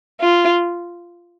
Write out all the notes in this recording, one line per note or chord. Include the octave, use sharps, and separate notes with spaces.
F4